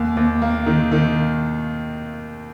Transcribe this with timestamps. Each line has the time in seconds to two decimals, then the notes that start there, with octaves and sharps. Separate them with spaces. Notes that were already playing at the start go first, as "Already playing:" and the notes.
Already playing: D#2
0.17 D#2
0.42 A#3
0.66 D#3
0.92 D#3